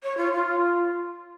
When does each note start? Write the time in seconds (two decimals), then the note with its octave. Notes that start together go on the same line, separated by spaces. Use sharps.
0.03 C#5
0.17 F4
0.33 F4